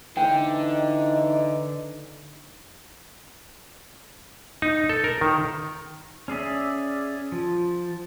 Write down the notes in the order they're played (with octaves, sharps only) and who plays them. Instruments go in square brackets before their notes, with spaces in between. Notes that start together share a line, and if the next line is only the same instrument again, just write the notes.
[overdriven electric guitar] D3 [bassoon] E3 [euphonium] D#4 [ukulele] C5 G5
[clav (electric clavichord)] D#4
A4
A#4
D#3
[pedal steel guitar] C#4 G#4 D5 E5
F3